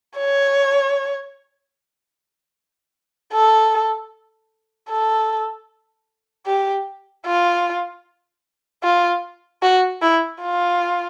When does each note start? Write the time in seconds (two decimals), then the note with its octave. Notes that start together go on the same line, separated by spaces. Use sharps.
0.17 C#5
3.32 A4
4.90 A4
6.47 G4
7.26 F4
8.83 F4
9.62 F#4
10.01 E4
10.41 F4